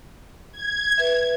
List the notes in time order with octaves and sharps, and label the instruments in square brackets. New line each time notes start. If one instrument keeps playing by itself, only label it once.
[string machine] G#6
[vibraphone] B4 E5